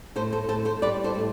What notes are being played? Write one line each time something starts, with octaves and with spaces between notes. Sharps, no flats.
A2 A4 C5
A4 C5
A2 A4 C5
A4 C5
G3 B4 D5
A4 C5
A2